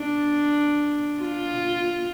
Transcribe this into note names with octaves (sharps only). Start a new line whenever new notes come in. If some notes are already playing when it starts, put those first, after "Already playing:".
Already playing: D4
F4